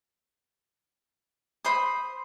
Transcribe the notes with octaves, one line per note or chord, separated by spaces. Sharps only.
C5 B5 D#6